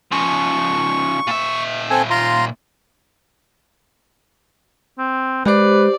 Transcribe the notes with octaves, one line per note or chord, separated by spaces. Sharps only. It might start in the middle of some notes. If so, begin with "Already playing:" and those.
C#3 F3 C#6
A#2 E5
C4 A4 G#5
F4 A#5 C6
C4
G#3 G4 B4 C5 D5